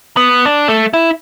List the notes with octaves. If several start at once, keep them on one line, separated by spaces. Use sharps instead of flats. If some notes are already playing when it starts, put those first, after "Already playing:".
B3
D4
A3
E4